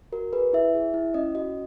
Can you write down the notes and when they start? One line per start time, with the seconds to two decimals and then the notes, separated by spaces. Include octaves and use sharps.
0.13 F#4 A#4
0.33 G#4 B4
0.53 E4 E5
0.74 G#4
0.94 E4
1.14 C#4 D#5
1.35 F#4 D#5